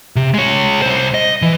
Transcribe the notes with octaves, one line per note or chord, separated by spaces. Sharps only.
C3
G#3 C#5
C2 C5
D#5
E3